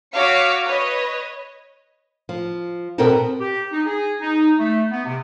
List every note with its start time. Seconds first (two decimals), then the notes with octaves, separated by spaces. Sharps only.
0.13 F#4 C#5 F5 D6 B6 C#7
0.65 B4 C#5 D#5
2.29 F3
2.98 B2 B3 C4 A4 A#4 A5
3.40 G4
3.72 D#4
3.86 G#4
4.21 D#4
4.58 A3
4.90 B3
5.05 C3